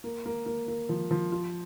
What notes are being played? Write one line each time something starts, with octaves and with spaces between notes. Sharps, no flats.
A#3
A#3
A#3
A#3
F3
F3
F4